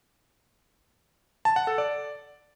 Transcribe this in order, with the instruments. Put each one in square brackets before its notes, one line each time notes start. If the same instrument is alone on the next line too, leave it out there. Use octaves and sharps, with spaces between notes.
[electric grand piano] A5
F#5
A4
D5